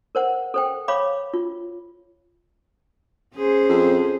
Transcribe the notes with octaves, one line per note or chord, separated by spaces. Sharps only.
A#4 C5 F#5
A4 C5 G5
C#5 F5 B5 D6
F4
C#4 G#4 C5
F2